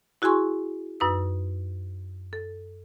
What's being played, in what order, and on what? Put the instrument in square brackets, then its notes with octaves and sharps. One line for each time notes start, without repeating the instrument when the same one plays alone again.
[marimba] E4 F#4 G#4 G#5 C6 C#6
F#2 D#4 B4 E6
A4